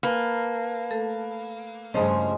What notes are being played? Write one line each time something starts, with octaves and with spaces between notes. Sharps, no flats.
A#3 B4 A5
A3 A4
G2 C#3 F3 G#3 A3 C#4 C5 D#5